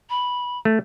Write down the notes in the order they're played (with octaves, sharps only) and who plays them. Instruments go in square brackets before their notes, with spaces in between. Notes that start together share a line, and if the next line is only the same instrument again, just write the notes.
[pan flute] B5
[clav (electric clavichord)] A3